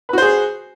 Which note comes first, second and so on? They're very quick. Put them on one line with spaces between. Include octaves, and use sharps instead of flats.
B4 F#4 C5 G#4